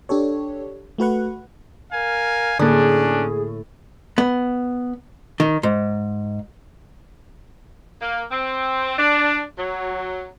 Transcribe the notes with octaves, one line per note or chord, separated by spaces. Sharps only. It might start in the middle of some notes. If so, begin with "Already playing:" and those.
D4 G4 A4 C#5
A3 F#4 B4 F#5
A#4 F5 G#5
A2 D3 A#3 C#4 D4 G#4
B3
D#3
G#2
A#3
C4
D4
F#3